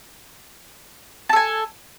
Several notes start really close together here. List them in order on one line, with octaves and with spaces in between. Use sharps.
A5 A4 G#5